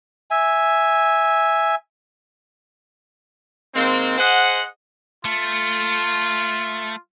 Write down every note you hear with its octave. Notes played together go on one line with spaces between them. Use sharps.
E5 G#5
D#3 G#3 A#3 C4
G#4 C5 D#5 F#5
A3 F4